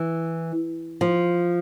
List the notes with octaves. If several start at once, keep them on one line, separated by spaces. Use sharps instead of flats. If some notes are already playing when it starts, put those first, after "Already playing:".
Already playing: E3
F3